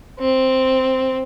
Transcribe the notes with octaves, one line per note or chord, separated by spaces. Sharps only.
C4